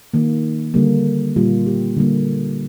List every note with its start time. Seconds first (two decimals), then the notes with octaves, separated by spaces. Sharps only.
0.14 D#3 A#3
0.74 D3 G3 A#3
1.36 A#2 G3 A#3 F4
1.66 G4
1.97 D3 G3 A#3